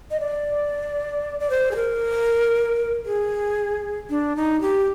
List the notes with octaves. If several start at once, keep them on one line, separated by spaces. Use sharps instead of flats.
D#5
D5
D5
C5
G#4
A#4
G#4
D4
D#4
G4